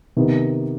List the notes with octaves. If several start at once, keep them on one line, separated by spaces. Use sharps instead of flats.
C3 D#3 B3